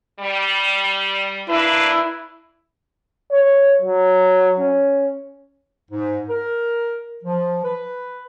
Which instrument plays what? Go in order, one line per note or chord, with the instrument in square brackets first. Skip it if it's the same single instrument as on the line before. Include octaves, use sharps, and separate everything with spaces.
[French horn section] G3
[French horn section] A#3 D4 B4 [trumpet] E4
[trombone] C#5
F#3
C#4
[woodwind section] G#2
A#4
F3
B4